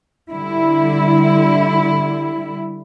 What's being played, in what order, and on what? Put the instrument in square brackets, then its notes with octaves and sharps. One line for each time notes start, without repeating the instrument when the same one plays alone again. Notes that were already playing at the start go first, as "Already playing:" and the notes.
[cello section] D3 G3 E4